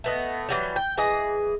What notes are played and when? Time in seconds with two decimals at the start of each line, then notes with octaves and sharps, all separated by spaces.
0.04 A3 B3 D#5
0.49 E3 F#3 G3
0.76 G5
0.97 E3 G#4 D#5